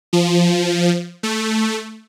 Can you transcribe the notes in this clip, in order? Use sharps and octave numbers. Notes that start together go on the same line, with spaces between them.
F3
A3